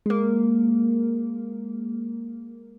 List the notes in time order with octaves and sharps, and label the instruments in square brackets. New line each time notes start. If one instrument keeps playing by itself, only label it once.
[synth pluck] G#3 A#3